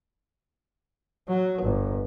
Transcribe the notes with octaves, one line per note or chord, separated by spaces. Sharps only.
F#3
G1